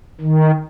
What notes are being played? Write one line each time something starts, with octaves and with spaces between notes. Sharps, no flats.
D#3